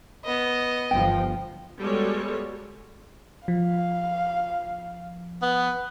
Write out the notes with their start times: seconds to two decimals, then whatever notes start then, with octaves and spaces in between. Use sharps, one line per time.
0.25 B3 D#5
0.91 G1 F3 G5
1.80 G3 G#3 B3 F#4 A4 C#5
3.48 F3 F5
5.42 B3